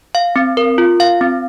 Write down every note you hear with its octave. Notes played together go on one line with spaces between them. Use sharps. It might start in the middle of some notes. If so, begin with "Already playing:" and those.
F5
C4
A#4
F4
F5
C4